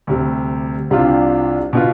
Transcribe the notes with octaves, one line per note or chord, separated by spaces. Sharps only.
D2 C3 G3
C2 C3 G3 D4 F4
B2 B3 F4